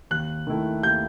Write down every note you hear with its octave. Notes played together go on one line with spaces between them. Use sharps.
D#2 F#6
D#3 A3 E4
D#2 G6